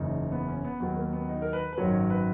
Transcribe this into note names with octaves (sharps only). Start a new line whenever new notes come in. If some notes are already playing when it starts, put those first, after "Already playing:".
Already playing: F#1 E2 C#3 D#4
B3
C#4
B3
D#2 D#3 F#3 B3
A#3
B3
D#4
A#4
B4
B4
G#1 F#2 D#3 F#3 C#5
B4